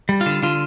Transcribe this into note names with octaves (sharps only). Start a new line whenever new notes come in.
G3
F4
D3
D3 F4